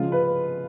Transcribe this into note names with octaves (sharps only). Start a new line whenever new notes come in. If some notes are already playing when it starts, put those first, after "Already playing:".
Already playing: C#3 F3 G#3 F4
B4